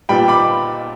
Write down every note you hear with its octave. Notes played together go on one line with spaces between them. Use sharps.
A#2 G3 B3 G5 B5
B5 D6